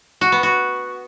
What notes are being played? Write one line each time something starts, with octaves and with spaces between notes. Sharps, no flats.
F#4
B3
F#4